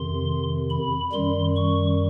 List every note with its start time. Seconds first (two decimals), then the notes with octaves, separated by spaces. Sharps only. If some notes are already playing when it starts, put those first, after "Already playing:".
Already playing: F2 C3 D#3 C6
0.70 B5
1.12 F#2 D#3 G3 C6
1.56 C#6